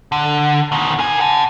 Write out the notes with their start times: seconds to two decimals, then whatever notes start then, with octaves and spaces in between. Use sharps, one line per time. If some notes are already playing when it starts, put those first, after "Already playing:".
0.12 D3
0.72 B2 D#3
0.99 A#4 G#5
1.20 F#5 A5